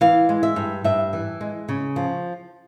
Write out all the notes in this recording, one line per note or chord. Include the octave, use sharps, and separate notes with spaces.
E3 F5
G#3
E5
G2
G2 E5
E3
G#3
C#3
F3